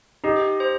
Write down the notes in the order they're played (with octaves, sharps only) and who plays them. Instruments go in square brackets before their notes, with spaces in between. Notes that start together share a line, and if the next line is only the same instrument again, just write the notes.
[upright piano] D#4 [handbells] G4
[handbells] C5